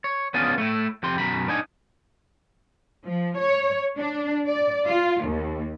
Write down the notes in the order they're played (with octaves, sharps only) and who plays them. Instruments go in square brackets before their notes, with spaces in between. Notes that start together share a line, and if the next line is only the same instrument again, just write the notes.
[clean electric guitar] C#5
B3 C#4 D4 F4 G#4
A3 E4
F2 G4 C6
F#2 B2 A#5 B5
D4 D#4 G#5
[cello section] F3
C#5
D4
D5
F4
D#2